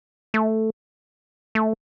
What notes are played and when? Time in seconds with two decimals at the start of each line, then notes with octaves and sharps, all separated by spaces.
0.34 A3
1.55 A3